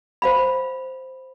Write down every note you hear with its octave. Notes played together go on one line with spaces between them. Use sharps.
C5 F5 B5